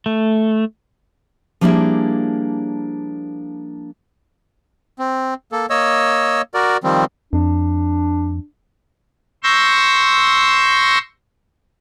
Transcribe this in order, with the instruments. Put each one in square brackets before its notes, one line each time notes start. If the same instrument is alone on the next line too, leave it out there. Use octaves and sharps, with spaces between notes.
[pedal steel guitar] A3
[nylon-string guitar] F3 G3 A#3 D4 E4 G#4
[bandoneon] C4
A#3 A4
A#3 C#5 D#5 E6
F#4 A#4 D5
D#3 F3 G3 C4
[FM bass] F2 [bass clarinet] D4
[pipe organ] C6 C#6 E6 G6 A#6